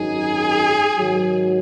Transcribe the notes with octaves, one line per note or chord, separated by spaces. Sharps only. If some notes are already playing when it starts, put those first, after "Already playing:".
Already playing: G#1 F#2 F#3 D#4 G#4
G#2 D#3 F#3